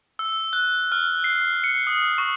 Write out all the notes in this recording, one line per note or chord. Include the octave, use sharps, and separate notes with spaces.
E6
F#6
F6
C7
C#7
D#6
C#6